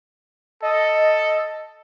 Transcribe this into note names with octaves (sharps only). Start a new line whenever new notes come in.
A4 D#5